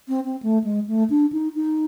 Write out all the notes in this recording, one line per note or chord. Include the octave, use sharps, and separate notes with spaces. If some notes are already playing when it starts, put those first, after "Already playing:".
C4
C4
A3
G#3
A3
D4
D#4
D#4